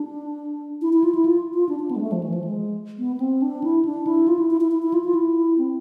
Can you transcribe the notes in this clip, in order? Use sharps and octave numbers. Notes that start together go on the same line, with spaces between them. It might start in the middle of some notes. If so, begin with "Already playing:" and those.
Already playing: D4
E4
E4
F4
E4
F4
F4
D4
D4
B3
G#3
A3
F3
E3
F3
G#3
B3
B3
C4
D4
E4
D4
E4
F4
E4
E4
E4
E4
E4
F4
F4
E4
C4